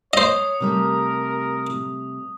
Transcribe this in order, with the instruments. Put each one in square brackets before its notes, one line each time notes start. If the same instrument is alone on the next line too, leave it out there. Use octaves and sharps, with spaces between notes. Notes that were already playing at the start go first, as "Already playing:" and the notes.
[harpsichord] C5 D#5 [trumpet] C#5 [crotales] D#6
[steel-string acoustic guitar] C3 G3 A3 [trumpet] A#4